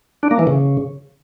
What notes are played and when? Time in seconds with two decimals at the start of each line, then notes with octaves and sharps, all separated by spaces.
0.23 D4
0.31 A#3
0.39 E3
0.47 C#3